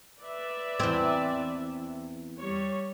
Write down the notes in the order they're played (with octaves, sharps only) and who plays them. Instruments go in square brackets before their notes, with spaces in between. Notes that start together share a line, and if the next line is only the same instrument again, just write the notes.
[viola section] B4 D5 E5
[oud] E2 C4
[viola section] G3 C#5